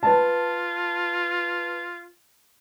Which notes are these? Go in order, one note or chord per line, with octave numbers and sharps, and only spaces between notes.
F4 B4 A5